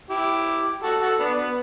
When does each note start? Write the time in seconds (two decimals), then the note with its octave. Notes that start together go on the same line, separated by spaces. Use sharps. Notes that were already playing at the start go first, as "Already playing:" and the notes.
0.10 E4 G4
0.83 F#4 A4
1.01 F#4 A4
1.19 B3 D4
1.38 B3